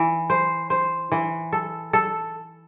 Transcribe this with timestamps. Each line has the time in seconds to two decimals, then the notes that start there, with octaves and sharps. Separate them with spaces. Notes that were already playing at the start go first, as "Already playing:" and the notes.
Already playing: E3
0.30 C5
0.70 C5
1.12 E3
1.53 A4
1.93 A4